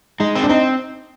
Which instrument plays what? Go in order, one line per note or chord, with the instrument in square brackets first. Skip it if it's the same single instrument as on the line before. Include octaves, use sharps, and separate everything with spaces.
[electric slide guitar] G#3 [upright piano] D#4
[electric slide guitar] C4
[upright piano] D4
[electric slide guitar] C4 [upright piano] D#4